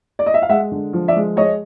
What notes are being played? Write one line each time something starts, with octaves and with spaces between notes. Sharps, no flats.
D5
D#5
E5
F5
G#3 E5 F#5
D3
F3
D5 E5
G#3
G#3 C#5 D#5